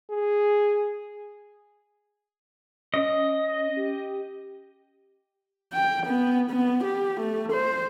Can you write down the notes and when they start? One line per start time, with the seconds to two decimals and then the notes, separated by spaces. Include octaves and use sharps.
0.11 G#4
2.94 C#4 D#5
3.77 G4
5.73 G5
6.06 B3
6.50 B3
6.84 G4
7.20 A3
7.52 C5